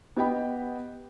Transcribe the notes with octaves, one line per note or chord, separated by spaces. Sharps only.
B3 G4 D#5 G5 B5